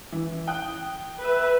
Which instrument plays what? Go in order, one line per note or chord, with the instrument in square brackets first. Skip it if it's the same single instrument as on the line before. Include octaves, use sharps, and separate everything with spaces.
[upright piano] E3
G5 D#6 F#6
[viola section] B4 E5